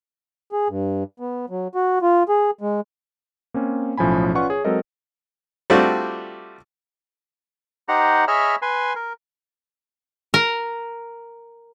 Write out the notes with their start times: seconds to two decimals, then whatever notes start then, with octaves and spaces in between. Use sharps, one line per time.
0.52 G#4
0.69 G2
1.20 B3
1.50 F#3
1.75 F#4
2.02 F4
2.29 G#4
2.61 G#3
3.54 A#3 C4 C#4
3.97 B1 A2 F3 C#4 G#5 B5
4.35 C#4 F4 B4 D5 F#5 C#6
4.50 G#4 C#5
4.65 F#3 G#3 C4 A4 A#4 D#5
5.70 G3 A3 C4 D4 F4 F#4
7.88 D#4 G4 C5 F#5 A#5
8.28 G#4 C#5 D#5 E5 B5 F6
8.62 B4 G#5 C6
8.95 A#4
10.34 A#4